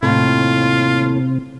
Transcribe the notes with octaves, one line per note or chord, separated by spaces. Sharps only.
D#2 A2 C3 F4